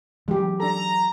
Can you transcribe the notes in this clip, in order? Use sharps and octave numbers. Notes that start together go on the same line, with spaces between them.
E3 F#3 G#3 G4
D4 A4 A#5